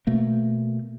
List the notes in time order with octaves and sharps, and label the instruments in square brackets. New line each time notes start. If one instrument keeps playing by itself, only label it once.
[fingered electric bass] B2 A3 A#3